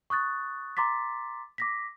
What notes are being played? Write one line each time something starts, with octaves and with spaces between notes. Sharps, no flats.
C#6 D#6 F#6 A6
A#5 C6 D6 A6 B6
D6 A#6 B6